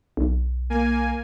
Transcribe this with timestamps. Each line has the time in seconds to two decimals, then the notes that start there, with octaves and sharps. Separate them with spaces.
0.17 B1
0.70 A#3 G#5